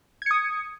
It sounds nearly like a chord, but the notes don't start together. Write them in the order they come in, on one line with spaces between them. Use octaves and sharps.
G#6 C#7 D#6